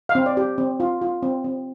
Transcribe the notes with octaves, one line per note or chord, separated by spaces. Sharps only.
F5
C4
D5
G4
C4
F4
F4
C4
C4